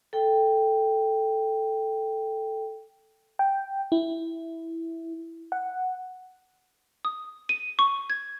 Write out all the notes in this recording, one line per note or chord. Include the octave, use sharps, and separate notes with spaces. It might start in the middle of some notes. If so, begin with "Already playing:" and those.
A4 G5
G5
E4
F#5
D#6
D#7
C#6
G#6